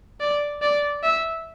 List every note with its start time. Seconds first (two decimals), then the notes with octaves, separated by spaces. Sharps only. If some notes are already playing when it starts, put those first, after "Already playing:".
0.20 D5
0.62 D5
1.03 E5